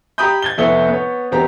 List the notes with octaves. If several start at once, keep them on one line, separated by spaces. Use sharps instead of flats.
G4 G5 A#5 B5 D#6 G6
G#6 A6 G7
F1 B3 E4 A4 C#5 G7
B3 C#5
E1 B3 C4 G4 A#5